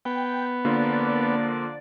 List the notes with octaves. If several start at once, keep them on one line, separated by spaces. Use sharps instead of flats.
B3 G5
D3 F3 A#3 D4 F4 D5